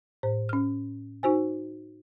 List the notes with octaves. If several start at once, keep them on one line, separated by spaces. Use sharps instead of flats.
A2 C5
C#4 F6
D#4 F#4 C5 G#5